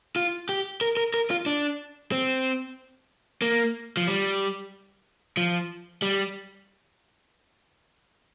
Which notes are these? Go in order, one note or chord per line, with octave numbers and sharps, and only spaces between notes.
F4
G4
A#4
A#4
A#4
F4
D4
C4
A#3
F3
G3
F3
G3